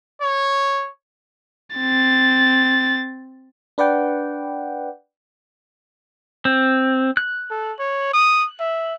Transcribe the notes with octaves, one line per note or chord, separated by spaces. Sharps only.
C#5
C4 A6
D4 B4 D5 F#5 G5
C4
F#6
A4
C#5
D#6
E5